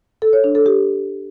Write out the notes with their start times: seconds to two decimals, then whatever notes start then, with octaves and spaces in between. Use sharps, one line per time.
0.22 A4
0.33 C#5
0.44 D4
0.55 A4
0.66 G4